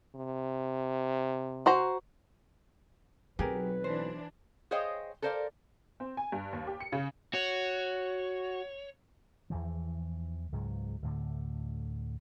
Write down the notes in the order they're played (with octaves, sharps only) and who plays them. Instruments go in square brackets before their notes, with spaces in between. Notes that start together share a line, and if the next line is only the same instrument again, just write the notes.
[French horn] C3
[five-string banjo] F#4 C5 A#5
[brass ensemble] B1 B4 [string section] F#3 [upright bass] C4 [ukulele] G4 G#4 A#4
[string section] E3 D4 [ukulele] C5
[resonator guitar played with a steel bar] G#4 C5 C#5 D#5 F5 G5
A4 A#4 C5 D5 F5
[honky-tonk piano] C4
G#5
G2
D#2
G4
C#7
C#3
[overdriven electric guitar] F#4 [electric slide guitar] C#5
[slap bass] E2 E3 F3
C#2 G#2 F#3
D2 A2 D3